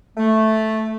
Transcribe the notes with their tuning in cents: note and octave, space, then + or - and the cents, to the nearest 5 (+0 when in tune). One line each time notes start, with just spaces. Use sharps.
A3 -5